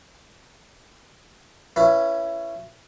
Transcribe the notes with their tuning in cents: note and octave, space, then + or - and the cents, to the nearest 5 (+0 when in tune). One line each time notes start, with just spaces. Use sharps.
C#4 +0 E4 +25 B4 +0